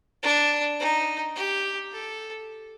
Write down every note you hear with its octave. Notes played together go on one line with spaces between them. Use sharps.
D4
D#4
G4
A4